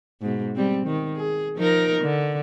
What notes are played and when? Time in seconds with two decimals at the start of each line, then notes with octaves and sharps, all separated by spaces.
0.22 G#2 B2
0.56 G3 C4
0.86 D#3
1.17 G#4
1.57 F3 D#4 A#4
2.01 D3